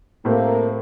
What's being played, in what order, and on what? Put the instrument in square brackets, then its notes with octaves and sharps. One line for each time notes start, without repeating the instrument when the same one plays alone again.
[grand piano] A2 A3 C4 G4 [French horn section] A#3